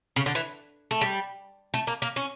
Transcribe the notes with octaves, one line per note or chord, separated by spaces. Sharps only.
C#3
D3
E3
A3
G3
A3
A#3
A#3
C#4